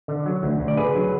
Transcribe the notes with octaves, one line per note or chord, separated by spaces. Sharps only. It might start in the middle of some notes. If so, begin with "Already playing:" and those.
D3
F#3
D2
D2
D5
D3 G#4 B4
F#3